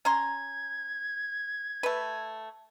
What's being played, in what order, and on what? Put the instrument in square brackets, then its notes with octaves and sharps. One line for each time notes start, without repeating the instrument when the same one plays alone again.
[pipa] C#4 A#5 C6 [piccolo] G#6
[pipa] A3 B4